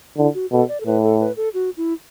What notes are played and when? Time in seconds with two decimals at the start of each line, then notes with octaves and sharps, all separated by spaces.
0.18 D3 E4
0.34 F#4
0.52 B2 A4
0.68 D5
0.81 A4
0.86 A2 B4
1.03 A4
1.20 B4
1.37 A4
1.54 F#4
1.77 E4